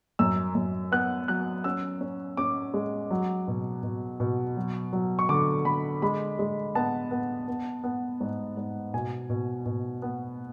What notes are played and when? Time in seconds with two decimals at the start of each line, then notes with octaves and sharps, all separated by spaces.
0.19 F#2 E6
0.55 F#2
0.92 B3 F#6
1.28 F#3 F#6
1.64 C#4 E6
2.01 C#4
2.37 C#4 D6
2.74 G#3
3.11 F#3
3.48 B2
3.83 B2
4.20 B2
4.57 F#3
4.93 F#3
5.19 C#6
5.29 D3 D6
5.65 D3 B5
6.02 G#3 B5
6.39 G#3
6.75 B3 A5
7.11 B3
7.48 B3
7.84 B3
8.20 G#2
8.57 G#2
8.93 B2 G#5
9.30 B2
9.66 B2
10.02 B3